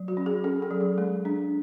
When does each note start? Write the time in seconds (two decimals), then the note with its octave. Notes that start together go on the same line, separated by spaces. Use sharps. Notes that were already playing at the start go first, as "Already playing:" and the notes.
Already playing: F#3
0.08 F#4
0.17 C#4
0.26 G#4
0.44 C#4 A4
0.62 A4
0.71 F#3
0.80 G#4
0.98 G#3
1.25 D4